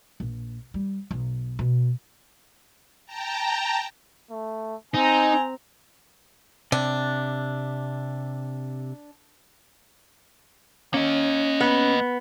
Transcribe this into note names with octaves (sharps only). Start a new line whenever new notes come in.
A#1
G3
B1
B2
G5 A5 A#5
A3
C4 D#4 G#5 A#5
C3 D4
A#3 C#4 D#5
B3